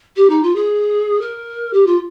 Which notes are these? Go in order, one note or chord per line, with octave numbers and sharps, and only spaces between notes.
G4
D#4
F4
G#4
A#4
G4
F4